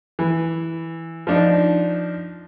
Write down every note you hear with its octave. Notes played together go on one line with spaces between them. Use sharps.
E3
F3 D4 D#4